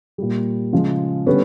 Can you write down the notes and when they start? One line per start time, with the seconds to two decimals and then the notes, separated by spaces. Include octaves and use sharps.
0.18 A#2 G3
0.73 C#3 F3 G#3
1.26 D3 G3 B3 C#4